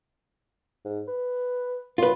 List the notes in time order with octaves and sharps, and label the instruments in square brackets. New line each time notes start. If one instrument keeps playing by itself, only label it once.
[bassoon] G#2
B4
[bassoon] F#2 [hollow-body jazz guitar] F4 B4